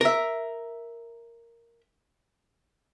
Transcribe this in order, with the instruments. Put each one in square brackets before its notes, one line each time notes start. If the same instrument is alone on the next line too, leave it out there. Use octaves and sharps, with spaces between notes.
[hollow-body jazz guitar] A#4 E5